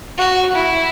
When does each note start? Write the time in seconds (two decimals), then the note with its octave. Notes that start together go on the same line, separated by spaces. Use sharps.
0.18 F#4
0.55 E4